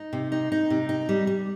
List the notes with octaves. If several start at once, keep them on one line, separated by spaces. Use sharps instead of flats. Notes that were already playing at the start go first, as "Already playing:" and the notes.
Already playing: D#4
C3
D#4
D#4
C3
D#4
G3
G3